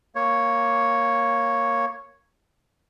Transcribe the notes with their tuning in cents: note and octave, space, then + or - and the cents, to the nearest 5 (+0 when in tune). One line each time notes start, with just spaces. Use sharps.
A#3 +0 C#5 +0